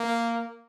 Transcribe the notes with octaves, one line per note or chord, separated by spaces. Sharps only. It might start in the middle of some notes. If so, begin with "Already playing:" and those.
Already playing: A#3